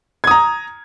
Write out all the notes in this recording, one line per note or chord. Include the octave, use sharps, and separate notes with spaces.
A#5 D#6 G#6